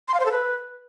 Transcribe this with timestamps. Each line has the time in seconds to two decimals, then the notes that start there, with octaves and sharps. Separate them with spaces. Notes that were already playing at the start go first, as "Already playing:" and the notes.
0.08 C6
0.14 F5
0.20 C5
0.26 A4
0.31 B4